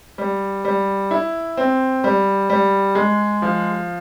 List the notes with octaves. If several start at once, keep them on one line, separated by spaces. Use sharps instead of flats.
G3
G3
E4
C4
G3
G3
G#3
F3